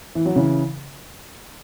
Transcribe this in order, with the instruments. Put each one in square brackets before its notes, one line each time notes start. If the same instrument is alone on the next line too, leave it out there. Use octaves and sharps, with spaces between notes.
[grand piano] E3
F#3
C#3 E3